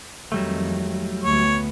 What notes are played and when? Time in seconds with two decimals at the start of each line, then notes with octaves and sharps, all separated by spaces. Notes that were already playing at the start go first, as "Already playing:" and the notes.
0.32 F2 D#3 F#3 G3 A3
1.24 D2 B3 C#5